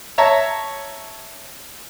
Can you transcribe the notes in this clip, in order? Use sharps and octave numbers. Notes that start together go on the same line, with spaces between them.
C#5 E5 A5 A#5